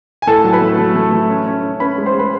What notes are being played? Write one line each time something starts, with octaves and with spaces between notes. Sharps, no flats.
G#5
A2 A4 A5
F#3
B4 B5
A3
A3
A3
A3
C#4
C#4
C#4
C#4 B4 B5
G#3
C5 C6
G#3 B4 B5